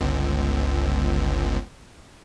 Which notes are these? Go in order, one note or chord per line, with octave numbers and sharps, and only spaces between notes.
G1 C#2